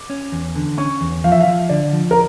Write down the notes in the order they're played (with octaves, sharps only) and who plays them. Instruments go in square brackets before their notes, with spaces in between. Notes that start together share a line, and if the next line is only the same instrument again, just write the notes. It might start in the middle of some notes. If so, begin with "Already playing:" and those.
Already playing: [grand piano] D6
[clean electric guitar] C#4
E2
D3
[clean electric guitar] C#4 [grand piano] C#6
[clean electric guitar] E2
[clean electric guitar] F3 [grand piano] F5
[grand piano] E5
F5
[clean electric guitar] F3
[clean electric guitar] D3 [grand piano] D5
[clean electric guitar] F3
[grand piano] A#4